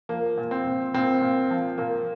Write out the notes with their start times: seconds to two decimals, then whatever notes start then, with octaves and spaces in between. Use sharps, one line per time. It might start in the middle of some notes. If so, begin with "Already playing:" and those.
0.09 F3 A#3
0.37 A#2
0.51 C4
0.66 A#2
0.94 A#2 C4
1.21 A#2
1.51 F3
1.78 A#2 A#3